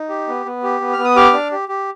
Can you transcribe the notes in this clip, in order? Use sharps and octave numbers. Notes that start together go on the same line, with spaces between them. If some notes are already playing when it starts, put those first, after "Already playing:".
Already playing: D#4
G4
B3
B3
G4
B3
B3 F6
D#6
G4 D6 F6
D4
G4
G4